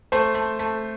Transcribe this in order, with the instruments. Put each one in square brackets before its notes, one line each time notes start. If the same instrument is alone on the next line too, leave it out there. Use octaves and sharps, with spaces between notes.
[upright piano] A3 C5
A3
A3